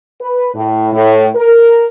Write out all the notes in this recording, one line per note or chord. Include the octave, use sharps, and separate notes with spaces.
B4
A2
A2
A#4